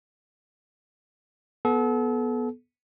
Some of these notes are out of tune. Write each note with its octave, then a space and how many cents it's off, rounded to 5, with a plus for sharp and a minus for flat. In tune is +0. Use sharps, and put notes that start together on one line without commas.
B3 -10 A4 -35